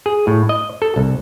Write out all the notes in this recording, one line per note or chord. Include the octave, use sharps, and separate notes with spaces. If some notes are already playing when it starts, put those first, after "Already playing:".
G#4
A2
D#5
A4
C2